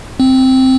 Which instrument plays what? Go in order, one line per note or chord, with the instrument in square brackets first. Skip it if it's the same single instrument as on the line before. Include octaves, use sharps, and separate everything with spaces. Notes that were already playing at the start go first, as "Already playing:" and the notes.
[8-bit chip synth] C4